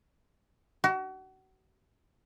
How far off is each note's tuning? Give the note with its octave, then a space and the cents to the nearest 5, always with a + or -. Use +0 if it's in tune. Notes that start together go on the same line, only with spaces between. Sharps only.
F#4 +35